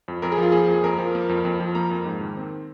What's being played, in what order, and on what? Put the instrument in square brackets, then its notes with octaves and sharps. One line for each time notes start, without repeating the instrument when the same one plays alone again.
[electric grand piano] F2
F2 A#4
G#4
F3 F4
A#3 G#4
F2
F2 A#4
F3
A#3
F2
F2
F3
A#3 A#5
F2
G#2
D#3
C4